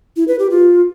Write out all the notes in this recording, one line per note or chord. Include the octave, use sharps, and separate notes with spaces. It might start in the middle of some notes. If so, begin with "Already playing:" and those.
E4
B4
G4
F4